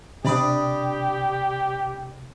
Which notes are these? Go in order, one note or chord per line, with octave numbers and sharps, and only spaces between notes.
C3 D4 G4 D5 B5 D#6